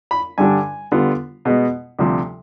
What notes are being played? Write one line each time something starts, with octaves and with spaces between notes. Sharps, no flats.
B5
G2 D3 G3 D4 G#5
D3 G3 B3 F4
B2 G#3 B3
D2 C3 F3